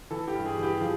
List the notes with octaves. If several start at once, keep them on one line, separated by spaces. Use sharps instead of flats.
E3 A4
G4
G2
G#4
E3 G4
F3 G#4